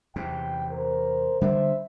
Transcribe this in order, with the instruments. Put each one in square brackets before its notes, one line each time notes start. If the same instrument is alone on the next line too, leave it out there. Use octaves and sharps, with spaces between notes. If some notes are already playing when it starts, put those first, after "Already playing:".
[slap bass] E2 C3 [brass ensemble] G5
[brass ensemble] A#4 C5
[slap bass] D3 G3 D4 [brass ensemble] C5 E5